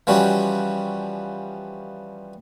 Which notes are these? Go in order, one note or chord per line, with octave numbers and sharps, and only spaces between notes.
E3 F3 G3 C#4 F#4